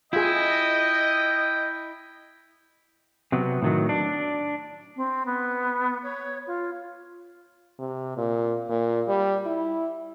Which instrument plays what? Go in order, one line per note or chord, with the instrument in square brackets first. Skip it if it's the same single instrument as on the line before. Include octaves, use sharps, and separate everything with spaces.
[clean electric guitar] E4 [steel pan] F4 G#4 [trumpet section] D#5 [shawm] G5
[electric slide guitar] C3 F#3 B3
A2 D#3 F#3
D4
[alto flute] C4
B3
C#5
F4
[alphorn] C3
A#2
A#2
G3
E4